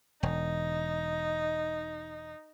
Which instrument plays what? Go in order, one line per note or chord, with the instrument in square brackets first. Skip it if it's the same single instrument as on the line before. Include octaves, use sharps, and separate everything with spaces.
[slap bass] E1 [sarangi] D#4